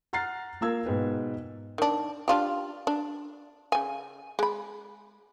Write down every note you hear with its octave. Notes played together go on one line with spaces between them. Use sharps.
F#5 A#5 F6 F#6 A6 C7
A#3 F4 A#4 E6 G#6
G#2 B2 B4 G5
D#3 D4
D4 F4 G4
D4
C#3 G#5
G#3 B5